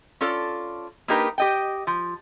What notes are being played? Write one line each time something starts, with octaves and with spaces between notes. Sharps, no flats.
C#4 F4 A4 D5
A#3 D4 D#4 G4 A#4 B4
G4 D#5 G5
F3